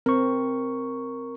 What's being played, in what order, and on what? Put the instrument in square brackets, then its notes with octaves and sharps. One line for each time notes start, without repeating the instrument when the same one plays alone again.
[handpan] C4 [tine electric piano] A#4 C#6